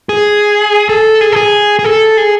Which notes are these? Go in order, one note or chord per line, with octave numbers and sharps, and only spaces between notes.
G#4
A4
G#4
A4
G#4
G#4
A4
G#4